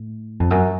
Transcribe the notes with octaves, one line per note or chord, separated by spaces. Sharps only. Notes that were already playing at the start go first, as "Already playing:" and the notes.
Already playing: A2
F2
F#2